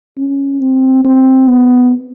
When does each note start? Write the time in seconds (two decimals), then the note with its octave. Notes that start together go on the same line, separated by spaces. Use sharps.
0.18 C#4
0.61 C4
1.05 C4
1.48 B3